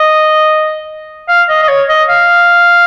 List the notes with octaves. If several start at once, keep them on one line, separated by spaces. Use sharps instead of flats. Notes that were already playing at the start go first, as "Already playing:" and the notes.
Already playing: D#5
F5
D#5
D#5
C#5
D#5
F5